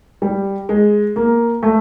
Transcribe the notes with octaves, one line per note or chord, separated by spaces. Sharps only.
G3
G#3
A#3
A3